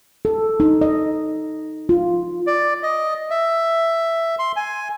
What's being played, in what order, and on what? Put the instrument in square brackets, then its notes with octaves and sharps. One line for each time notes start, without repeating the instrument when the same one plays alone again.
[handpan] A4
D#4
D#5
F4
[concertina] D5
D#5
E5
C6
G#5